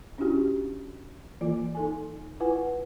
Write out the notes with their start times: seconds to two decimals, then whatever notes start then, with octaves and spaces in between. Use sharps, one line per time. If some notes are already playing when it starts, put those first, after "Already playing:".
0.18 C#4 D4 E4 F#4 G4
1.41 E3 A#3 F4
1.75 D#4 A4 G#5
2.40 E4 F4 B4 F#5 G#5